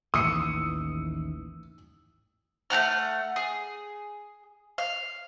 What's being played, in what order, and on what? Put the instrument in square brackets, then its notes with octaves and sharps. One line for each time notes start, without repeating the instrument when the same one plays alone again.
[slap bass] A1 D#2 E3 [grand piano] D#6 [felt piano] E6 C#7 D#7
[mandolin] A3 C4 F#5 F6
G#4
F5